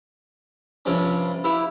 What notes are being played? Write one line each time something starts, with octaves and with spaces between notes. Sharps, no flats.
G2 C3 F3 G3 C4 C#4
E4 G4 B4 F5